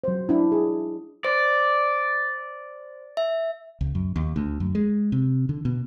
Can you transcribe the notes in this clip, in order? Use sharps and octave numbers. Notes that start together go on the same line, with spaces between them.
F#3 C5
D4 E4
G#4
C5 D5
E5
C#2
F#2
D#2
D2
F#2
G#3
C3
D3
B2